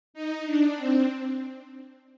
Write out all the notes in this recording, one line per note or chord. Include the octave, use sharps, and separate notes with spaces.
D#4
D4
C4